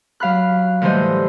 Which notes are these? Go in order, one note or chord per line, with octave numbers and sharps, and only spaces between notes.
F#3 F5 B5 F#6
A2 D3 E3 G3 C5 D#5